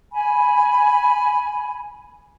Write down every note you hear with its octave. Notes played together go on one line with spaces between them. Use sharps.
G#5 B5